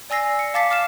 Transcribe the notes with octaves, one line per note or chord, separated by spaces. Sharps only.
D5 G#5 E6 A#6 C7
C#7
F5 A5 D6 A6 B6 C7
D6 F6 C7 E7